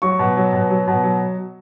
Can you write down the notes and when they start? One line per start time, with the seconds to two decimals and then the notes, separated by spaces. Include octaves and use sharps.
0.02 F#3 C#6
0.19 B2
0.37 F#3
0.53 B2
0.70 F#3
0.88 B2
1.03 F#3